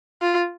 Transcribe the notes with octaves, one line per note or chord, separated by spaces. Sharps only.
F4